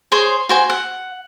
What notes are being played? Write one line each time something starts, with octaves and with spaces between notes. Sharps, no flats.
G#4 C5 C#5 C6
F#4 C5 G#5
F#5